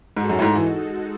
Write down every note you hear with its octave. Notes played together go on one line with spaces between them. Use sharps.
G#2 G#3 D#4 F#4 A4
F#2
A2
G#2
E3